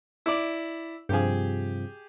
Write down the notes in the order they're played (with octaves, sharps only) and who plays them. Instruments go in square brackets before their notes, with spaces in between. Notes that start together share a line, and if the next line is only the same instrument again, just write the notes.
[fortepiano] E4 D5
[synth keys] G2 C3 F3 [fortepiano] G4 G#4